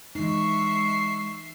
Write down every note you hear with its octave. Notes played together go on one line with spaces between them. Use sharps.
E3 G#3 D#4 E5 C#6 C7